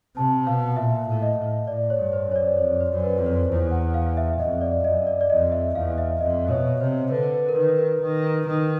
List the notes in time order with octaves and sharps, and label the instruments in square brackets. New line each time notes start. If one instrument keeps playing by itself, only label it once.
[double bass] C3 [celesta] A5
[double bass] B2 [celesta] F5
[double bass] A#2 [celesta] E5
[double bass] A2
[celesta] D#5
[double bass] A2
[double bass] A2 [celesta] D5
[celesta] C#5
[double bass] G2
[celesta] C5
[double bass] F#2 [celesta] C#5
[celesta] D5
[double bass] F2 [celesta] C#5
[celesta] C5
[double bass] F#2
[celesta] B4
[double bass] F2
[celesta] C5
[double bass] E2
[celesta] F#5
F5
E5
E5
[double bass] F2 [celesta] D#5
[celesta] D5
[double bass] F#2 [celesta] D#5
[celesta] D5
D5
[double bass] F2 [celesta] D#5
[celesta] E5
[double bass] E2 [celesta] F5
[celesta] E5
[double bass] F2 [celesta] D#5
[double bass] B2 [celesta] C#5
[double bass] C3 [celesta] C5
[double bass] D3 [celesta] B4
[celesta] B4
A#4
[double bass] D#3 [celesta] B4
[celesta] A#4
[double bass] D#3
D#3